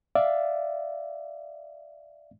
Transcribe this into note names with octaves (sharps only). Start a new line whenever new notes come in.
D5 E5 F5